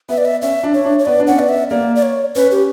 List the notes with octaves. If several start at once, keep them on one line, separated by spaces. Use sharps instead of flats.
B3 E5
D5
E5
C#4 E5
D4
C#5
D4
C#5
B3 D5
D4
C#4 F#5
B3 D5
E5
A#3 D5
D5
C#5
C#4 B4
G4